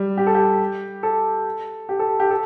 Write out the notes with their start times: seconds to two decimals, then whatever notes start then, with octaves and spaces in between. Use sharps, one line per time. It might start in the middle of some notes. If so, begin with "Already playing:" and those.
Already playing: G3
0.17 G4
0.27 A4
0.35 G4
1.03 A4
1.89 G4
1.99 A4
2.20 G4
2.31 A4